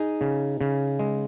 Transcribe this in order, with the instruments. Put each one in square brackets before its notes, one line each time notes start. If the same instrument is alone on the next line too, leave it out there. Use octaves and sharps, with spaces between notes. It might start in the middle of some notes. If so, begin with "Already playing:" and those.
Already playing: [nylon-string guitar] D#4 G#4
[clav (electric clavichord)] C#3
C#3
G#3